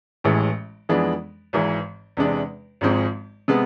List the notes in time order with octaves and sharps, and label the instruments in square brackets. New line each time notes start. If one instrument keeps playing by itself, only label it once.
[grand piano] A1 A2 E3 G#3
F2 E3 G#3 B3 D4
G#1 G#2 E3
E2 C3 G#3 D4
G#1 G#2 F3 G#3 C4
C3 G#3 B3